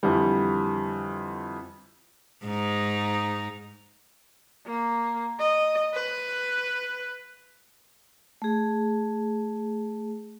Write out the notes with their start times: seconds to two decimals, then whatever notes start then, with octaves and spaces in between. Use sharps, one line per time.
0.03 F2 D3 E3 G3
2.45 G#2 D#4
4.66 A#3
5.39 D#5
5.94 B4
8.42 A3 G#4